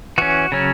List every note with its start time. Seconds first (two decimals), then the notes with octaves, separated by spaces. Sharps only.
0.18 E3 C#4 F#4
0.52 C#3 F#3 C#4